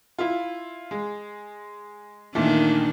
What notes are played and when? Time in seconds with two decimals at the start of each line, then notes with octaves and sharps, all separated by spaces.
0.19 E4 F4
0.91 G#3
2.35 E2 A#2 D#3 A3 D4